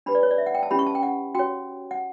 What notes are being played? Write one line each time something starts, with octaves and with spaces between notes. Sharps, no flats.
D4 G4 B4 B5
D5
C#5
D5
E5
F#5
G5
A5
C#4 E4 G4 B5
C#6
A5
G5
F#5
F#4 C#5 G5
F#5